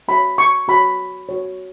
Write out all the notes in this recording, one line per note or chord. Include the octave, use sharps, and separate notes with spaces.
F#4 C#5 B5
C#6
F#4 C#5 B5
F#4 C#5